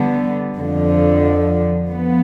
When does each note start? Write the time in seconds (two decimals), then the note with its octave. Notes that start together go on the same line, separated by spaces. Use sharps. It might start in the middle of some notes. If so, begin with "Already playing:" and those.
Already playing: D3 G3 B3
0.57 F2 D3 F3
1.89 F3 B3